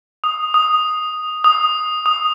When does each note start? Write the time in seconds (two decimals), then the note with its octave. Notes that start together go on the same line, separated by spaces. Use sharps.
0.24 D#6
0.54 D#6
1.44 D#6
2.06 D#6